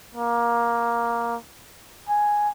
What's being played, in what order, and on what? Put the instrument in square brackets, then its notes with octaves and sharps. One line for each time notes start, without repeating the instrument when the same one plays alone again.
[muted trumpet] A#3
G#5